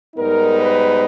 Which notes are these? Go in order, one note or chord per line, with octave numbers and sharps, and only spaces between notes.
G#2 G3 B3 D#4 A#4
B4